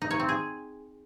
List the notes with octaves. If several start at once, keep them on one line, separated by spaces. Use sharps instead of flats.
D#4
C#5
C4
G#4